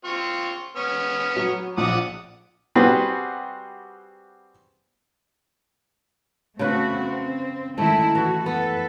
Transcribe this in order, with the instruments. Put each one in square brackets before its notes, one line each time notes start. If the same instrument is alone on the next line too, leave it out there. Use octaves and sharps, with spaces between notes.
[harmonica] C4 F4 C#6
B3 C#4 F6
[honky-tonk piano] F#3
[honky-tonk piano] A#1 [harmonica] D5 F#5 D#6
[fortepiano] G3 C4 F#4 G#4 B4
[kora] C#3 B4 [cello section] A3 C4 F#4
[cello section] C4
[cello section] D#3 G#3 E4 [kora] A3
[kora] E3 [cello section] F#4
[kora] B3 [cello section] A4 B4